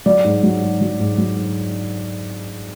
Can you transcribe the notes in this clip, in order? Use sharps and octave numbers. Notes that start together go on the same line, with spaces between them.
F#3 D5
G#2
F#3
G#2
F#3
G#2
F#3